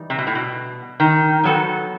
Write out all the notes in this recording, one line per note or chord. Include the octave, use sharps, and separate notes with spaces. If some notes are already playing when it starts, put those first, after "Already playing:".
Already playing: E3 G3 D#4
C3
B2
A2
B2
D#3
F#3 B3 F#4 A4